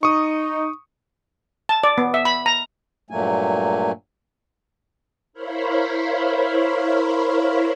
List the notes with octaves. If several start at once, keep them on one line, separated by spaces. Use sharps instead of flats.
D#4 C#6 D#6
A5
D5
B3
E5
B5
A#5
G2 A#2 F#3 A3 A#3 G#5
E4 A#4 C5 C#5 F5 B5